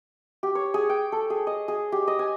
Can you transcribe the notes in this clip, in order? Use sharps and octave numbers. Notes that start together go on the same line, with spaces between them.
G4
C#5
G#4
G5
A4
G#4
D#5
G#4
G4
D#5
G#5